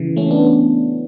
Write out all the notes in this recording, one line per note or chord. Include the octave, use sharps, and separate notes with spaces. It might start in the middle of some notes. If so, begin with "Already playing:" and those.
Already playing: C#3 E3
A3 C#4
B3 D4